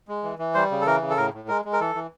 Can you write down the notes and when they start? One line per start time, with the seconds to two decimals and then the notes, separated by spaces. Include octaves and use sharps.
0.08 G#3
0.23 E3
0.39 E3
0.54 G3 C5
0.71 C#3
0.81 A4
0.86 E3 A#4
1.02 C#3
1.10 A4
1.17 A2 A#4
1.34 A2
1.48 G#3 A#4
1.65 G#3
1.73 A#4
1.81 E3 A4
1.95 E3